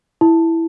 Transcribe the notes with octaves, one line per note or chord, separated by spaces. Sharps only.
E4